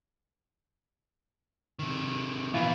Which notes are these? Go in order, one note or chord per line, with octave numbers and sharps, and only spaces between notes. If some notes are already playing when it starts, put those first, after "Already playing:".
C3 D#3
A#2 E3 B3 E4 F4